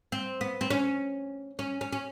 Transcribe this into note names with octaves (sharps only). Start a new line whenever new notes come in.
C4
B3
C4
C#4
C#4
C#4
C#4